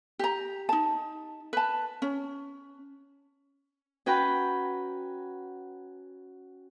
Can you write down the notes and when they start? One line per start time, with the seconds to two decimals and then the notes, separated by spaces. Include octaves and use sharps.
0.19 G4 A#5
0.69 D#4 A5
1.53 B4 A5
2.02 C#4
4.06 C#4 F#4 B4 G5 A#5 B5